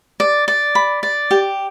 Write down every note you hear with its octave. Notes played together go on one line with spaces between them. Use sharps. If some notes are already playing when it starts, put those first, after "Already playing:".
D5
D5
B5
D5
G4